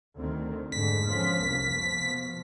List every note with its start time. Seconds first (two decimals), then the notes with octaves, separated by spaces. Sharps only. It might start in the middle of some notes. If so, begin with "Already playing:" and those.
0.18 D2 D#3 C4
0.72 F2 G#2 D3 B6
1.05 F3 B3 C#4
1.41 F1 C2 A#3
1.72 B2 F3